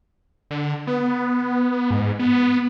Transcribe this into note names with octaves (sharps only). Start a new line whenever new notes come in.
D3
B3
G#2
B3